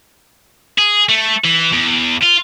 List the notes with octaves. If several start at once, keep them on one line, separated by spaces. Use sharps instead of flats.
G#4
A3
E3
E2
F4